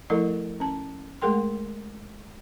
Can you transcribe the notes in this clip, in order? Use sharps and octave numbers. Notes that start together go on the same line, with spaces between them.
F3 A3 E4 A4 A#4 D#5
C#4 A5
G#3 A3 G#4 A#4 G5 C6